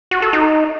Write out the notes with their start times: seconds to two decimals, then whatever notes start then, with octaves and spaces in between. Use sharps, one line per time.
0.11 F#4
0.22 A4
0.33 D#4